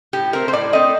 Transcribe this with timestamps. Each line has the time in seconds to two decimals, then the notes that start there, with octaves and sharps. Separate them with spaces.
0.13 A2 G4
0.33 A3 C4 A#4
0.48 C5
0.53 A2 D5
0.73 A3 C4 D#5